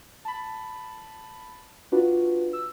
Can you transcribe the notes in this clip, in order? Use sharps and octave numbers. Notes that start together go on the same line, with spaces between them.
A5 B5
D4 F4 F#4 B4
E6